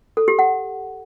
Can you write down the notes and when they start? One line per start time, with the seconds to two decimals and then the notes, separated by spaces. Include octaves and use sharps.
0.17 A4
0.28 G4
0.39 F#5